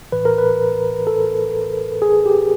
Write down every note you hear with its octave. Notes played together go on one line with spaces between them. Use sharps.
A2 E3 B4
A#4
B4
A4
G#4
G4